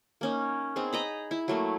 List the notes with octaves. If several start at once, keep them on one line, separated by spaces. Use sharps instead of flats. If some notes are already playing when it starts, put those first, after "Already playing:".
A#3 C#4 D#4
B3 C4 D#4 G#4
D#5 A#5 B5
E4
F#3 A3 A#3